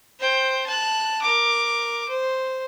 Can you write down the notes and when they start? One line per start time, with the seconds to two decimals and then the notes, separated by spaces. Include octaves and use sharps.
0.19 C5 G5
0.66 A5 F#6
1.22 A#4 D6
2.08 C5